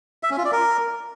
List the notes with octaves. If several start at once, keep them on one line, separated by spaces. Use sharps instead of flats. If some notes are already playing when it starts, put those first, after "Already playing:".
E5
C#4
F4
D5
A#4